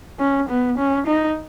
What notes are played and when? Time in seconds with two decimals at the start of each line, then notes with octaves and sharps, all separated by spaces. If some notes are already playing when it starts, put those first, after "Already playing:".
0.19 C#4
0.49 B3
0.78 C#4
1.07 D#4